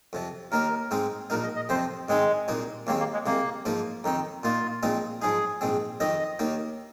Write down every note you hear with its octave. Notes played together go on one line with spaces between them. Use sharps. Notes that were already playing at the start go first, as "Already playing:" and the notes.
F2 C3 F3
D#2 D#3 A#3 D#4 A#4
G#2 G#3 C4 D#4
A#1 A#2 A#3 D#4 A#4
D#5
D#5
F2 C3 F3 C4 C5
G#2 D#3 G#3 C4 D#4
C2 A#2 A#3 D#4
D#2 D#3 G#3 A#3 C4
A#3
G#3
C2 C3 G#3 A#3
G#2 F3 A#3 D#4
F2 D#3 C4 D#4
A#2 A#3 D#4 F4
A#1 A#2 G#3 C4 D#4
G#2 F3 G#3 D#4 G#4
A#1 G#2 G#3 C4
F2 D#3 C4 D#4 D#5
D#2 D#3 A#3 D#4